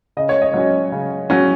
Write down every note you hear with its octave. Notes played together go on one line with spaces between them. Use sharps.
C#3 D#5
C#5
D#5
F#3 C#4
C#3
F#3 C#4